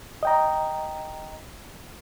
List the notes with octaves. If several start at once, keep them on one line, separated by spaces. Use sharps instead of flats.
D#5 G5 A#5